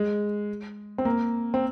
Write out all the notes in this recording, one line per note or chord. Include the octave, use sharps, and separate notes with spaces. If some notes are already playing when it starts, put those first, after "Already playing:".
Already playing: G#3
C4
A#3
C4